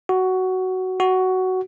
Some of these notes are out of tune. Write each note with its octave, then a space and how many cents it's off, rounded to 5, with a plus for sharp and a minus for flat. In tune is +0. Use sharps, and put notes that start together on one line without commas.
F#4 +10
F#4 +10